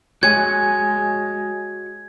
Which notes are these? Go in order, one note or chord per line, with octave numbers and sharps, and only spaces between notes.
G#3 F#4 C#5 G#5 G#6